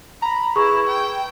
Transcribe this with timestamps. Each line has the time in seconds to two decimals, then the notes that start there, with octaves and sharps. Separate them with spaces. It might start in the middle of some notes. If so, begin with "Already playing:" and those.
0.22 A#5 B5
0.56 E4 G#4 B4 C#6
0.88 G5